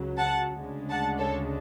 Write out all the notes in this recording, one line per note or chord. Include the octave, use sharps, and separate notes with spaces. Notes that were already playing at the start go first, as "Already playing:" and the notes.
Already playing: C#2 C#3 F#3
F#5 A5
D2 C#3 G#3 D4
F#5 A5
A4 C#5